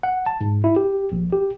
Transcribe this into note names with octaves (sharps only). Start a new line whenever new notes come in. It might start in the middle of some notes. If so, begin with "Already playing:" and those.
F#5
A5
G#2
E4
G4
A#1
G4